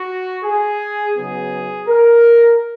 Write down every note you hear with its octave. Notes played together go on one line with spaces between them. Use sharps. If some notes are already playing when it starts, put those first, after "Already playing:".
Already playing: F#4
G#4
C#3 F#3 B3 D#4 G#4
A#4